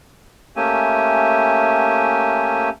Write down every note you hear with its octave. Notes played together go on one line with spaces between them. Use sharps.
A3 A#3 C#4 G4 E5 G#5